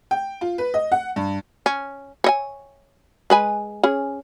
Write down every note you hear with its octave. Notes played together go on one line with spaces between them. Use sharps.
G5
F4
B4
D#5
F#5
G2
C#4
C#5 D#5 G#5
G#3 B4 G#5
C#4 G#4